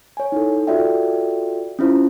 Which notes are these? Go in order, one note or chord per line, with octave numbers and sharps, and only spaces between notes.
C#5 G#5
D#4 E4 A4
F4 F#4 A4 D5 E5 G5
C#4 E4 F4 C5